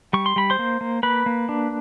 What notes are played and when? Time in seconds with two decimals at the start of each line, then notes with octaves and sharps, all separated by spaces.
0.13 G3 C#6
0.26 C6
0.36 G3 B5
0.50 C5 C6
0.59 A#3
0.81 A#3
1.03 A#3 B4 B5
1.26 A#3
1.49 D4